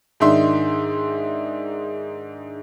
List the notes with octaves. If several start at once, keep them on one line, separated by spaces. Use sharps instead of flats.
G#2 D#3 D4 D#4 E5 C6